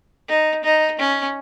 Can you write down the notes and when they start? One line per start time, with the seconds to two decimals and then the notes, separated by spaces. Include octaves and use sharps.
0.28 D#4
0.64 D#4
0.99 C#4